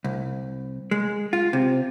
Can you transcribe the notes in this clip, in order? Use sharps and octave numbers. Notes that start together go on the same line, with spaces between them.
C2
G#3
F4
C3